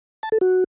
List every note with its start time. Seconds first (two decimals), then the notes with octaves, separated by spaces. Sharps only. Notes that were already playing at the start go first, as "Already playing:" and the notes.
0.23 A5
0.32 A4
0.41 F#4